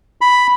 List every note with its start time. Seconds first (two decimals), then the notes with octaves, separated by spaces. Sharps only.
0.21 B5